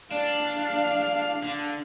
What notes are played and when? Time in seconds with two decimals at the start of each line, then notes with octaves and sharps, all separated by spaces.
0.11 D4 F5
1.44 D3